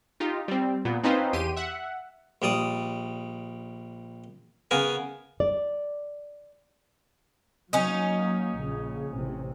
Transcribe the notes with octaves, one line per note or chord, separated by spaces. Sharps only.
D#4 F4 G4
G3 C4
A#2 B3
C4 C#4 D#4 F4 B4 C5
E2 G4 C6 D#7
E5 F#5
A#1 G3 D5 D#6
C#3 B3 A#4 G#5
D5
F#3 A#3 C#4 D#4
A#1 C#3
A1 C3